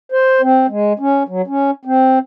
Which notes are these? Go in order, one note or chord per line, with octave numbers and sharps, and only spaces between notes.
C5
C4
G#3
C#4
F#3
C#4
C4